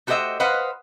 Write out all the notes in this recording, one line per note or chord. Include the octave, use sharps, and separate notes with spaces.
A3 F#4 G4 C5 D#5 E5
B4 C5 D#5 F5 F#5